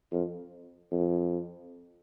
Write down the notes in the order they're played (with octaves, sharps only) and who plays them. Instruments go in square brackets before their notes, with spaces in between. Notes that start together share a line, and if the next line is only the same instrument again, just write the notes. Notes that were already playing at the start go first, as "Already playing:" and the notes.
[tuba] F2
F2